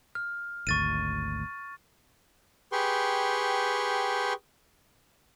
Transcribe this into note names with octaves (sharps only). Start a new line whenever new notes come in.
F6
G#1 D2 C#6 A6 D#7
G4 G#4 B4 G5 C6 C#6